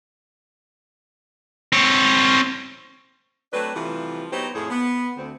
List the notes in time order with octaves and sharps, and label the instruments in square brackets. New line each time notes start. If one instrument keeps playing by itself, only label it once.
[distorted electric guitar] C4 C#5
[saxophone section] F#3 A3 C4 D4 B4
C3 E3 F3 G3 A3 F4
F#3 B3 D#4 G4 C5
F2 A2 F3 G#4 C#5
B3
D2 C4